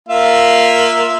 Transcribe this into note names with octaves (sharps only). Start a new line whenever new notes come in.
A#3 F4 E5